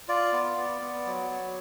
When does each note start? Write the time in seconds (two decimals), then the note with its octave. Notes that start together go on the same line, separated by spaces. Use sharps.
0.08 F4 D5
0.33 B3
0.57 B3
0.81 B3
1.06 F#3
1.30 F#3